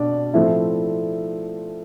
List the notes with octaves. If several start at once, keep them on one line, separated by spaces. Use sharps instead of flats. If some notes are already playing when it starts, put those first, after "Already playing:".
Already playing: B2 D4 D5
A2 F3 A3 C4 E4 E5